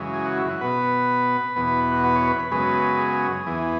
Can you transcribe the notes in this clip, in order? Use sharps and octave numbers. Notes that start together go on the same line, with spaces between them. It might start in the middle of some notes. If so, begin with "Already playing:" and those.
Already playing: F#2 C#3 E3 G#3
G#4
F#4
E4
F#4
B2 B3 B4
E2 B2 B3
B4
F#4
B4
C#5
B4
B4
F#2 C#3 G#3 B3 B4
G#4
E2 E3 B3